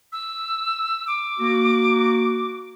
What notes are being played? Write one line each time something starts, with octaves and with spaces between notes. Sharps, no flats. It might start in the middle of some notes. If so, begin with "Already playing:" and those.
E6
D6
A#3 F#4